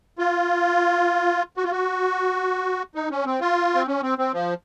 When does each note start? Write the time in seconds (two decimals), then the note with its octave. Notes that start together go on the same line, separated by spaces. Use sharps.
0.18 F4
1.57 F#4
1.64 F4
1.71 F#4
2.95 D#4
3.11 C#4
3.26 C4
3.41 F4
3.75 C4
3.87 C#4
4.03 C4
4.18 C4
4.33 F3